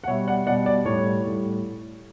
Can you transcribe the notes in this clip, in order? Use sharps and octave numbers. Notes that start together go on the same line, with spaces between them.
F#5
B2 G3 C#5 E5
D5 F#5
B2 G3 D5 F#5
D5
A2 G3 C#5
A2 G3